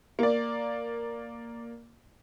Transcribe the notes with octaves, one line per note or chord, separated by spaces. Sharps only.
A#3 D5